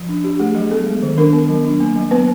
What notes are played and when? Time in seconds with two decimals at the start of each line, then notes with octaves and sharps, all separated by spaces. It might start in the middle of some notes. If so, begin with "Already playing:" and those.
Already playing: F3
0.09 D4
0.24 D4 G4
0.40 A3 G#4
0.55 F#3 G#4
0.70 B3 A4
0.86 G#3
1.03 D#3
1.18 D4 A#4
1.33 B3
1.49 F#3
1.65 D4
1.80 A#3
1.96 F#3
2.11 B3 B4